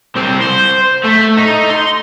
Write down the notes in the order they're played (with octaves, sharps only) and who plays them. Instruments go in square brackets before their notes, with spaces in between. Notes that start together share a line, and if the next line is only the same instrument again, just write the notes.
[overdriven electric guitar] C2 C4
C5
A3
D#4
C6